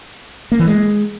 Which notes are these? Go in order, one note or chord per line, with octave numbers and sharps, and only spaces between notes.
A#3
E3
G#3